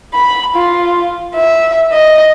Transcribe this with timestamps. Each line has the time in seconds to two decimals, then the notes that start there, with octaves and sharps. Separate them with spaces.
0.15 B5
0.55 F4
1.35 E5
1.93 D#5